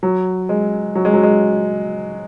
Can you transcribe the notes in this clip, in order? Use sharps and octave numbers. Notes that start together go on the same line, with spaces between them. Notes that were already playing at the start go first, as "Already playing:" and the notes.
F#3
G#3
F#3
G#3
F#3
G#3